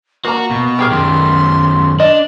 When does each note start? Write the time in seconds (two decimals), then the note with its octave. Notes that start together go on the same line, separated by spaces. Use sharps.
0.25 A#3 F#4 A#5 C#6
0.51 B2
0.79 G4 G#4 A#4
0.91 F#2 D#3 C6
2.00 D4 D#5